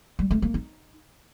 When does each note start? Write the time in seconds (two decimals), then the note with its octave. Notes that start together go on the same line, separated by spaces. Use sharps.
0.19 G3
0.31 A3
0.42 A#3
0.54 D#4